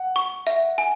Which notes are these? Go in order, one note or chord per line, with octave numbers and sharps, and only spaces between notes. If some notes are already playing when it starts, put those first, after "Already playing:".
Already playing: F#5
C#6
E5
G#5